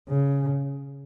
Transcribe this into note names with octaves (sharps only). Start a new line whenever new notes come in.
C#3